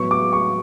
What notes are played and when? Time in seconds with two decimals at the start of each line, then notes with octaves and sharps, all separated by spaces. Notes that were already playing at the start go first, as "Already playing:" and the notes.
Already playing: A2 F#3 B3 C#6
0.11 D6
0.33 C#6